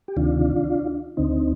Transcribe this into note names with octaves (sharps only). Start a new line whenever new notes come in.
G4
D2 C3 D#3 D4 F4
D2 D3 C4 D#4